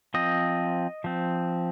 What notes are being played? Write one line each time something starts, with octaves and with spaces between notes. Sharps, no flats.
F3 C4 D#5
F3 C4